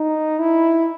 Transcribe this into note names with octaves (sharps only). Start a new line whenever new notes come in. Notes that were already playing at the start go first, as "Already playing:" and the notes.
Already playing: D#4
E4